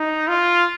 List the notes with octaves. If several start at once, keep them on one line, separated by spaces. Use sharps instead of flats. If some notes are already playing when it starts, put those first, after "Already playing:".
Already playing: D#4
F4